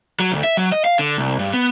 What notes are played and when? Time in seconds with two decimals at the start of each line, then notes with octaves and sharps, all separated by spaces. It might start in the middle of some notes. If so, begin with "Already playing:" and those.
0.20 F#3
0.32 D2
0.44 E5
0.57 F#3
0.72 D#5
0.85 F5
0.99 D3
1.18 C2
1.39 G2
1.54 B3